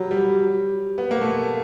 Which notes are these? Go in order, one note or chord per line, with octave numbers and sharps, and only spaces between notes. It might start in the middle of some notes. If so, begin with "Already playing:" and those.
Already playing: F#3 G3
G3
B3
A#3
A3